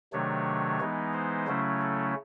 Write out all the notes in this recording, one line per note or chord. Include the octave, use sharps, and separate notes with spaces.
C3 D#3 F#3 A3 D4 C#5
E3 G#3 B3 D#4
C5
C#3 F#3 A3 C#4 E4
A4